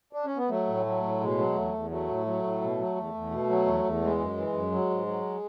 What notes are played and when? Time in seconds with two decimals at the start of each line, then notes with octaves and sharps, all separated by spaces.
0.13 D4
0.25 C#4
0.37 B3
0.49 F#3 A3
0.67 A2
0.86 F#3
1.03 A2
1.20 B2 G#3
1.38 F#3
1.55 E2 A3
1.74 E2
1.90 F#3 A3
2.09 A2
2.26 F#3
2.43 A2
2.61 B2
2.78 F#3
2.96 E2
3.14 E2
3.30 B2
3.49 F#3
3.66 E2
3.84 E2
4.01 E3 G#3
4.19 F#2
4.37 E3
4.53 F#2
4.72 F#3
4.90 G#2
5.06 F#3